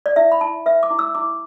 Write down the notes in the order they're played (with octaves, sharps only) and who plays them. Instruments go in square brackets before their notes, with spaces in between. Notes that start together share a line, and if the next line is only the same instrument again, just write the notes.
[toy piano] D5
E4 E5
B5
E4 A5
B4 E5
D6
E4
E6
E4 D6